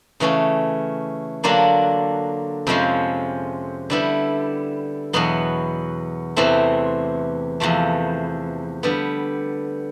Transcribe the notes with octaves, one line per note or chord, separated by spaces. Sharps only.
C#3 E3 A3 C#4
D3 F#3 A#3 D4 F4
F2 C3 F3 G#3 C#4
D3 G3 B3 E4
E2 B2 F#3 B3
E2 C3 E3 A3 C4
E2 C3 F3 A3
D3 G3 B3